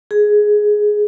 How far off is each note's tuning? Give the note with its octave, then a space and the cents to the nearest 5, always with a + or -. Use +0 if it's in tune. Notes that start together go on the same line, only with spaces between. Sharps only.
G#4 +10